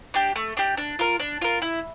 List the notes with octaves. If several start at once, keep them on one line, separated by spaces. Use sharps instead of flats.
D4 G4
A3
D4 G4
D4
F4 A#4
D4
F4 A#4
E4